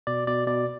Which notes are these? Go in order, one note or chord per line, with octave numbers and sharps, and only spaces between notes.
B2 D5
B2 D5
B2 D5